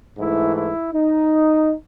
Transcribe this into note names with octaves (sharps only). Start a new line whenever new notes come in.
G#2 E3 A3 E4
E4
D#4